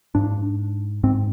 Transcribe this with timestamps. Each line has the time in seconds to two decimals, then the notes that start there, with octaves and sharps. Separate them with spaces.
0.15 G#2 D4
1.03 G#2 C4